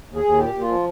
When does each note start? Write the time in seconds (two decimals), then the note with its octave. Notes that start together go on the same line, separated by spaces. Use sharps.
0.08 D#2
0.16 G#4
0.24 D#2
0.38 A#2 G4
0.54 A#2
0.61 F4
0.68 F3